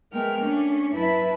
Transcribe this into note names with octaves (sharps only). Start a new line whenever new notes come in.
G#3 A3 B3 A#4 G5 F6
A3 C#4 D4
F#2 E4 B4 E5 A5 B5